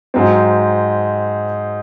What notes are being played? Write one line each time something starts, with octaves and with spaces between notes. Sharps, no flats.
G#2 F#3 C4